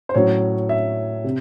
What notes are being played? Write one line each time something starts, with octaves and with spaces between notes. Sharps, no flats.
C5
A2 F#3 C#4 C#5
E5
C3